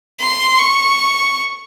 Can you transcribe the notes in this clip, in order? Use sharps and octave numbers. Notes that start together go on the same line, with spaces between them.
C6
C#6